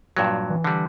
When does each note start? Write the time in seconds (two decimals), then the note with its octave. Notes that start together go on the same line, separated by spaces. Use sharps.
0.17 G2 A#2 F#3
0.50 E3
0.64 D3 G3